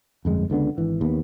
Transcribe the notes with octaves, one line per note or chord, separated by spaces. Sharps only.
G1 F2 G#3
C#2 D3 B3 D4
G#1 E3
D#2 B3